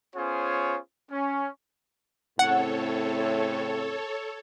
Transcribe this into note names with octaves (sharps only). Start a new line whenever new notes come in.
B3 C#4 F4 G#4 C5 C#5
C#4
A2 C#3 C4 A4 C#5 F#5